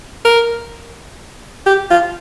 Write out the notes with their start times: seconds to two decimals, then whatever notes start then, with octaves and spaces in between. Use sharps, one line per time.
0.25 A#4
1.66 G4
1.90 F4